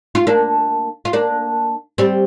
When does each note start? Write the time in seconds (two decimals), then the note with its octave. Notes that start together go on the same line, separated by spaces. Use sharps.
0.15 F4
0.27 A#3 D4
1.05 F4
1.13 A#3 D4
1.98 G3 C4